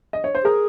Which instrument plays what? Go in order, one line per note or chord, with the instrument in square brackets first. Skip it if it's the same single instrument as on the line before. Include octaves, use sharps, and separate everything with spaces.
[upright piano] D#5
C#5
C5
[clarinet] G#4 [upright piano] A#4